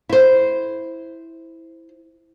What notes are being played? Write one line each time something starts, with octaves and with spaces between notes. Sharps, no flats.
E4 C5